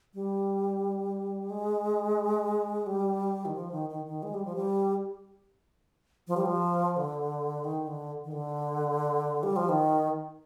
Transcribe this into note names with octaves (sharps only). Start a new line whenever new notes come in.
G3
G#3
G3
D#3
F3
D#3
D#3
D#3
G#3
G3
F3
G3
F3
G3
F3
D3
D#3
D3
D#3
D3
G3
F3
D#3